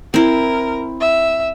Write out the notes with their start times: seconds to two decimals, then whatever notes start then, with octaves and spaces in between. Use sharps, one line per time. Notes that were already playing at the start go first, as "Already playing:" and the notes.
0.14 C4 E4 A#4
1.00 E5